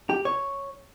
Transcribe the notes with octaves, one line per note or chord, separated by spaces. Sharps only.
G4
C#5